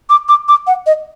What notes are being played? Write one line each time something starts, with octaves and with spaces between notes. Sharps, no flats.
D6
D6
D6
F#5
D#5